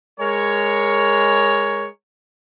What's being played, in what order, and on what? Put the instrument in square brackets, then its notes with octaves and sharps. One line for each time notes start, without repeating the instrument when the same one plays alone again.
[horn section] G#3 A#4 C#5